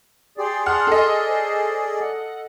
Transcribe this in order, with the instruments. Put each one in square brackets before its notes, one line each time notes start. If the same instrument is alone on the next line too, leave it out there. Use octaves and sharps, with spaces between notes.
[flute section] G4 C6 [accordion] G#4 D5
[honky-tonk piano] F#5 F6 [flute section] A5 C6
[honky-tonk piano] A4 D#5
[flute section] C5
F#5